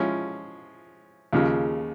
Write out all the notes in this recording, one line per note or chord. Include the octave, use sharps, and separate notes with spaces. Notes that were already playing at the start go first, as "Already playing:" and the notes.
Already playing: F3 G#3 C#4 E4
D#2 C#3 F3